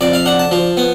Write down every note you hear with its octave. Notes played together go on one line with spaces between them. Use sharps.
F2 D5
F5
D4 F#5
A5
F3
B3